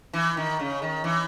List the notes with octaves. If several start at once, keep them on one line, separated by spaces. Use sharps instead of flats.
E3
D#3
C#3
D#3
E3